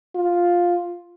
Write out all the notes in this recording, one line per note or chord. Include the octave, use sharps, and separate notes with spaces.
F4